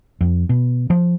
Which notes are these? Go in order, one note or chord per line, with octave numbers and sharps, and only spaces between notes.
F2
B2
F3